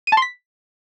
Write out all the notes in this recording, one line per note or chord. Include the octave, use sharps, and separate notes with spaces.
D#7
A5
C6
B6